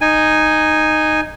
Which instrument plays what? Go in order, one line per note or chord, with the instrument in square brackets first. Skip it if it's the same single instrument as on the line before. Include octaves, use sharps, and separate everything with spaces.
[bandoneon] D#4 G#5